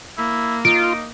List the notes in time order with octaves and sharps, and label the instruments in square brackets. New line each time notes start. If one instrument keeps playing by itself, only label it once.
[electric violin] A#3 [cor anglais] E4
[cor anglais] D#4 [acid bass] F4 [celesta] D7